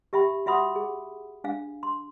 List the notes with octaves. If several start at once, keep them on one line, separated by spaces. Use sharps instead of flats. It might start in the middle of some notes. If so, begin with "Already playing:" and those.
G4 E5 G5 B5
F#4 E5 F#5 B5 D#6
G#4
D4 F5
C6